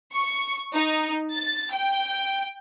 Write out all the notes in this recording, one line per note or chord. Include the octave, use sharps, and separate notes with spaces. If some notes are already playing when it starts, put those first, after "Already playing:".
C#6
D#4
A6
G5